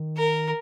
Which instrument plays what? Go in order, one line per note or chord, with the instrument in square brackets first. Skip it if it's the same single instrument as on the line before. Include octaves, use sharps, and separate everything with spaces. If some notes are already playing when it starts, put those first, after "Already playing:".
Already playing: [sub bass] D#3
[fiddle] A#4